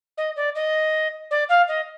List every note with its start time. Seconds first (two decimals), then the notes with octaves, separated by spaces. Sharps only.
0.18 D#5
0.36 D5
0.55 D#5
1.31 D5
1.49 F5
1.68 D#5